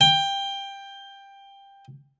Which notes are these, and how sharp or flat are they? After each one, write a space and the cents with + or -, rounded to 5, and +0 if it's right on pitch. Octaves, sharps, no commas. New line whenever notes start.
G5 +15